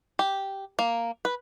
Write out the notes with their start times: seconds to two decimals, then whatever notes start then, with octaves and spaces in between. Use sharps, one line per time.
0.19 G4
0.79 A#3
1.25 B4